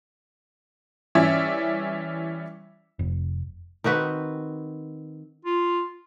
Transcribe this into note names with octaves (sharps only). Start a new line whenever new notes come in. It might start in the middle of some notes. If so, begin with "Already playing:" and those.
E3 G3 C#4 D5 E5
F1
D#3 C4 F#4 B4
F4